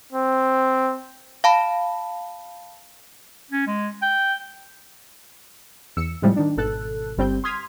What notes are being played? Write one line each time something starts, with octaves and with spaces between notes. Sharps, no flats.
C4
F5 A5 B5
C#4
G#3
G5
E2 E6 C#7
A2 C3 F3 G3 G#3
D#3 D4
G#1 B2 A4 F#6
G1 G3 C4 G6
C6 D#6 F6 G#6 B6